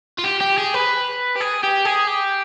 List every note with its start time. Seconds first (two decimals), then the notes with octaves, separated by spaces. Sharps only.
0.18 F4
0.24 G4
0.40 G4
0.58 G#4
0.74 B4
1.36 G4
1.41 G#4
1.63 G4
1.85 G#4
2.08 G4